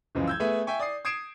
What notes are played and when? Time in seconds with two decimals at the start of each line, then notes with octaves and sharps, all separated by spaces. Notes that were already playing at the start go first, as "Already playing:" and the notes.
0.15 C#2 F#2 E3 F3 G#3
0.27 E6 G6 G#6
0.40 A3 B3 G#4 B4 E5 G#5
0.67 E5 G5 G#5 C#6
0.79 D5 D#6 C7
1.05 D#6 G#6 C7 D7 E7